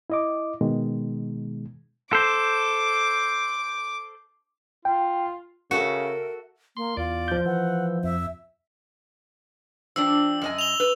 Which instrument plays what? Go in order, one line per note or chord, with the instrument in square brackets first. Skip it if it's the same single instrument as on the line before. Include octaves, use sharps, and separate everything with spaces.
[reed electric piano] E4 D#5 D6
B2 D#3 G#3
[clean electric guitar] A4 C5 [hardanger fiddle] D6
[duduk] F4 [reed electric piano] G5
[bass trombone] C#3 [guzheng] F#4 A4 E5 [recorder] A#4 [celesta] C#7
[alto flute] A#3 [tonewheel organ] C6
[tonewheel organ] E2 D5 [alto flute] F4
[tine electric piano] F3 G6
[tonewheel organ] E3 [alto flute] F#5
[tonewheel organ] F2 [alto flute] E5
[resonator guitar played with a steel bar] F3 C4 D4 [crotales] E6
[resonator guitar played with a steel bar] F#2 D#5 G#5
[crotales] F7 G7
[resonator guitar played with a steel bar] B4